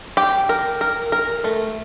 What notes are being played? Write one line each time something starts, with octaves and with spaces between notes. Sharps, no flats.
G4
A#4
A#4
A#4
A3